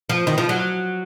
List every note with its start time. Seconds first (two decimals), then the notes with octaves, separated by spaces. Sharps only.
0.09 F3
0.27 D#3
0.38 F3
0.49 F#3